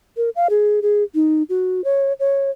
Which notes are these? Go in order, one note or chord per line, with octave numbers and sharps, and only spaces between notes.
A#4
F5
G#4
G#4
D#4
F#4
C#5
C#5